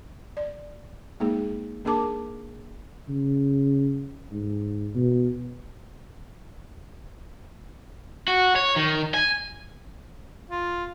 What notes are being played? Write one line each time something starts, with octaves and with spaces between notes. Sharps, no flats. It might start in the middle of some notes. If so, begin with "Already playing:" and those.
D5
G#3 A#3 D#4 G#4
A#3 D4 G#4 A#4 A5 D6
C#3
G#2
B2
F#4
C#5
D#3
G#5
F4